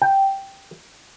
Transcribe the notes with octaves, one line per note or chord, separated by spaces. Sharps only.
G5